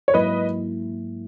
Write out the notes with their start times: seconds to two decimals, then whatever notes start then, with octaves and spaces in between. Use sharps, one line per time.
0.08 C#5
0.14 G#2 F#3 A#3 E4 B4 D#5